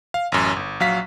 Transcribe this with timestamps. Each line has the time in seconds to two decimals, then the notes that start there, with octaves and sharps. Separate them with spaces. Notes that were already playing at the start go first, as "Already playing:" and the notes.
0.14 F5
0.32 A1 F#2
0.56 G1
0.80 A#1 F#3 F5 B6